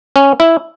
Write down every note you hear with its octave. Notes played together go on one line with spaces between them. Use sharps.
C#4
E4